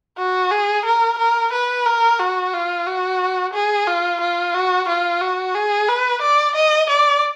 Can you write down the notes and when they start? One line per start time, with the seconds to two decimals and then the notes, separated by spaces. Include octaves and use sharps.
0.19 F#4
0.52 G#4
0.86 A#4
1.19 A#4
1.53 B4
1.86 A#4
2.20 F#4
2.53 F4
2.86 F#4
3.54 G#4
3.87 F4
4.21 F4
4.54 F#4
4.88 F4
5.21 F#4
5.55 G#4
5.89 B4
6.22 D5
6.55 D#5
6.89 D5